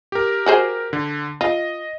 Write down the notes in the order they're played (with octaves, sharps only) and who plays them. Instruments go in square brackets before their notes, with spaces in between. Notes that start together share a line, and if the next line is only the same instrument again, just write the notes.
[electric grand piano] G4 A#4
[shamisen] F#4 G#4 C5
[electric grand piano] D3
[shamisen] F4 [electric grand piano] D#5